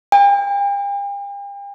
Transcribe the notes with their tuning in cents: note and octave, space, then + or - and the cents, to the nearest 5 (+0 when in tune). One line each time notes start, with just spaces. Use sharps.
G5 +45